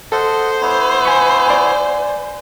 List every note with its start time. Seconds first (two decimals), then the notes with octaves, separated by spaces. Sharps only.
0.12 A4 C5 D#5 F#5
0.62 B3 E4 C#5
1.05 G#5 B5 C#6
1.46 D5 G#5